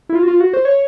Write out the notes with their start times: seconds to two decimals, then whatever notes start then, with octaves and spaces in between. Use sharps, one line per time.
0.09 E4
0.15 F4
0.23 F#4
0.28 F4
0.40 F#4
0.54 C5
0.65 C#5